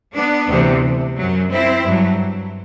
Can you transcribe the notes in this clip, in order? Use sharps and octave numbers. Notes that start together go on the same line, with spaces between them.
B3 D4
D2 C3 E3
F#2 F#3
C4 E4
G2 F#3